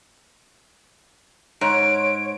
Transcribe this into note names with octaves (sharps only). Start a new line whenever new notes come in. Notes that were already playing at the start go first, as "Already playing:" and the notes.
G#2 C#5 D7